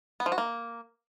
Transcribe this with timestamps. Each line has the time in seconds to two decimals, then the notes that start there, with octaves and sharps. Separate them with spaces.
0.20 B3
0.26 F3
0.32 F#4
0.38 A#3